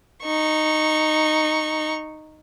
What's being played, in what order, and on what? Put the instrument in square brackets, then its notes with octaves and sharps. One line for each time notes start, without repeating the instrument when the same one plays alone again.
[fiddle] D#4 C#6